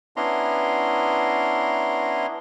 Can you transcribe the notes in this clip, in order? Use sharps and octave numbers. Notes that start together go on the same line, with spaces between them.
B3 C#4 D4 E4 A#5 C6